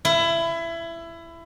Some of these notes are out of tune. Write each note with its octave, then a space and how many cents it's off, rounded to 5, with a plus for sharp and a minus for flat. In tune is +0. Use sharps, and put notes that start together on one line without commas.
E4 +20